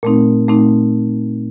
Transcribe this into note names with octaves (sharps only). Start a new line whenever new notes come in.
A#2 A3 C4 D#4
A#2 A3 C4 D#4